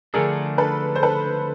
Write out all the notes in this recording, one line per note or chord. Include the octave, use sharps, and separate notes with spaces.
D3 F3 A3 D4 G#4 A#4
A4 B4
C5
A4 B4